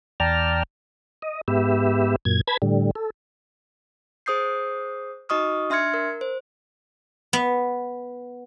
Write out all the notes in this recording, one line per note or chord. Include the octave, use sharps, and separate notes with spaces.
E2 D5 G5 A5 A#5 F6
D#5
G#2 B3 G4 E5
F#2 A#2 G#6
B4 A5 B5 G#6
A2 D3 G3
A4
G#4 C5 D#6 G6 C7
D#4 F#4 D#5 C#6 D#6 F6
D4 E5 C6 F6 G#6 C#7
A#4
C5
B3